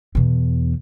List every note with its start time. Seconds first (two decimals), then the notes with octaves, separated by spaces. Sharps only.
0.15 E2 B2